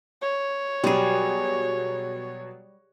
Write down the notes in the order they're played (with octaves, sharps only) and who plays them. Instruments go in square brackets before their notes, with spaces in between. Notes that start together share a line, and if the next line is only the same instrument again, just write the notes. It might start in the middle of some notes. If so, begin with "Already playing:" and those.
[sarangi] C#5
[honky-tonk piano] B2 F#3 [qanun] G3 G#4